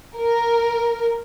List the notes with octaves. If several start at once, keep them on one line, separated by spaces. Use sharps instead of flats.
A#4